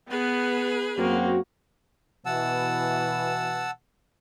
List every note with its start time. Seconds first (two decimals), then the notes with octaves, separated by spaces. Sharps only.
0.10 B3 G#4 B4
0.98 F#2 A#3 C4 F#4
2.26 B2 E3 F#5 A5 E6